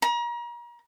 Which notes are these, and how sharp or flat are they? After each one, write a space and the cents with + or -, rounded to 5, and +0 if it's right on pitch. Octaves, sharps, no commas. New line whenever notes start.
A#5 +35